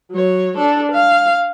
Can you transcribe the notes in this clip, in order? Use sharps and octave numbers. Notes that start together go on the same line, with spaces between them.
F#3 C#5
D4 A4
F5